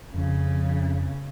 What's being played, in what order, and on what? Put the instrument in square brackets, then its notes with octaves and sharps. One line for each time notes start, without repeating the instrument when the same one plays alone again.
[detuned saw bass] F2 [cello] C#3